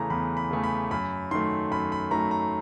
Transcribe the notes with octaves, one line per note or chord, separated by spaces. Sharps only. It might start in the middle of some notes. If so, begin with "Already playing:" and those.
Already playing: E2 C#3 E3 A3 A#5
E2 B5
B5
C#3 E3 A3
B5
F#2 B5
D#3 F#3 A3 C6
F#2 B5
B5
D#3 F#3 A3 A#5
A#5